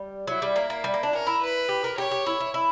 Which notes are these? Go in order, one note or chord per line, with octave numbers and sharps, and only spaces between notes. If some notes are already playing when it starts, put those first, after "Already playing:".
Already playing: G3
F#3 E4
G3
A#3
A#3
G3
A#3
D4
C#4 A#4
E4
B4
G4
A#4
G4 C#5
G4
E4
E4
E4